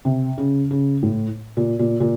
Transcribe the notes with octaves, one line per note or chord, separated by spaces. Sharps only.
C3
C#3
C#3
A2
A#2
A#2
A#2